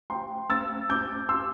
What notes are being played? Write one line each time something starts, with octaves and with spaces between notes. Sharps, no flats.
G5 C6
E6 A6
D6 G6
C6 E6